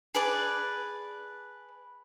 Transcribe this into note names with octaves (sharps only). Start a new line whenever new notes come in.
G#4 B4 D5 A5